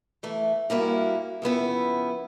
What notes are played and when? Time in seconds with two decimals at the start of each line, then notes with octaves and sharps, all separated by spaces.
0.23 E3 A3
0.70 G2 A#3 E4 F#4
1.42 F2 C#3 B3 E4